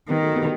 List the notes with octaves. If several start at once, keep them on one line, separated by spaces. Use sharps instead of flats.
D#3 G3 B3
F#3 A3
G3 B3